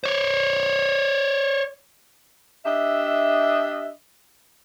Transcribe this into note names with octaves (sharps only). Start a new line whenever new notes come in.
C5 C#5
D4 G4 D#5 E5